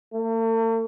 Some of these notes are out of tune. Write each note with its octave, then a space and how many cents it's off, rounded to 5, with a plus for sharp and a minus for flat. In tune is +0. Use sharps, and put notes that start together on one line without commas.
A3 +45